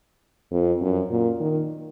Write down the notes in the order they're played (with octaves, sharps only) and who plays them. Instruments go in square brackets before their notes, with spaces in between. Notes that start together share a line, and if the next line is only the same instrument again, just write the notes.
[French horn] F2
F#2
A#2
D#3